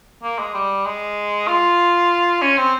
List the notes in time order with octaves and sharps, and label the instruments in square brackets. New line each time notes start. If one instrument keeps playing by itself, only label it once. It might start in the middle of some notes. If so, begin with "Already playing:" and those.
[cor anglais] A#3
G#3
G3
G#3
F4
C#4
C4